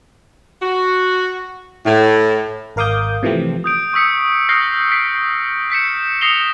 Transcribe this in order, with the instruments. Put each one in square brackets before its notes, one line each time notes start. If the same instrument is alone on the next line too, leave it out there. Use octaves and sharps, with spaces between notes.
[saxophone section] F#4
A2
[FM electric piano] G#1 A#4 F5 D6 D#6 G6
C3 E3 F3 A3 C4
[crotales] D#6 G6 D7
C#6 D#6 E6 B6 C#7
D#6 F6 G6 A#6 C7
B6 C7 D7
G6 B6 C#7 E7
D#6 A#6 C7 C#7 F7 G7